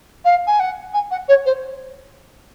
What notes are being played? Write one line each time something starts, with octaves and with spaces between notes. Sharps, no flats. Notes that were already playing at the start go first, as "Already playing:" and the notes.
F5
G#5
F#5
G#5
F#5
C#5
C5